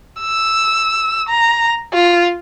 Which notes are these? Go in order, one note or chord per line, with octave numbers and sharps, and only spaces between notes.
E6
A#5
F4